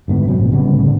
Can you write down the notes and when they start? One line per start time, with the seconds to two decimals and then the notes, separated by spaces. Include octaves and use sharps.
0.08 D2 G#2 B3
0.26 C3 F#3 C4
0.40 A1 A#2
0.52 C#3 G3 B3
0.74 A2 C#3
0.86 C#3 C4 D4